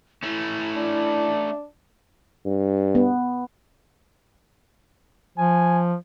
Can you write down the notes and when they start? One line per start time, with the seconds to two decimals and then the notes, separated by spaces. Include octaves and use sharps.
0.23 A3 C#4 E4
0.76 D4
2.45 G2
2.95 B3
5.38 F3 G#5